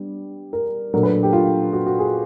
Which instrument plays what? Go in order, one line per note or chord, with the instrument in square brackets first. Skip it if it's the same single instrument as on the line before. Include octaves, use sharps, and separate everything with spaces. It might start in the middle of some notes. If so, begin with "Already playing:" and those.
Already playing: [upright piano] G3 B3 D4
A#4
A#2 F#3 A3 D4 A#4
B4
G4
F4
F#4
F#4
G#4